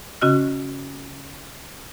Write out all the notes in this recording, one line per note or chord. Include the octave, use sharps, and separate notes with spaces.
C#3 C#4 F#4 D#5 F6